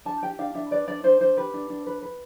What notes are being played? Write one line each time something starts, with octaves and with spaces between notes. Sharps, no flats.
D4 A5
G4 G5
D4 F5
D4 E5
B4 D5
D4 D5
D4 C5
D4 C5
G4 B4
D4
D4
B4
B4